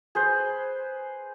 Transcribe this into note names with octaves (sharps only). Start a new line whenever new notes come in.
G#4 B4 C5